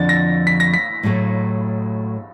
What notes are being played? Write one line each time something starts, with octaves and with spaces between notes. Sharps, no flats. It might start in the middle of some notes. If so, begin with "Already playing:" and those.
Already playing: F2 D3 F3 A6
A#6
B6
A#6
B6
A2 F#3 A3